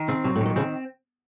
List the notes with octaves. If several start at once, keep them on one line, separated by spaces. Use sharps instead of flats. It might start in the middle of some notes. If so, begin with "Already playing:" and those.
Already playing: D#3
C#3 C4
C3 F#3
A2
A#2 D#3
C#3 F3 C4